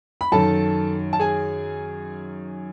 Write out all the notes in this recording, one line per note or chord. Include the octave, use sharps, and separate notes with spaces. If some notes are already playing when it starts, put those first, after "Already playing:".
B5
F#2 D#3 A4 A5
A5
G#4 G#5